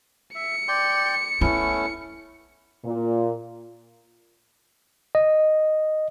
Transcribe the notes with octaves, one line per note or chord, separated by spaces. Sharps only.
E5 C#7
D5 G5 C6
A3 B3 C#4 D#4 E4
A#2
D#5